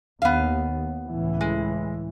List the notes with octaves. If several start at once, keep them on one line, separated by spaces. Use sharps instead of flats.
D#2 B3 F5
C#2 A2 E3
G#3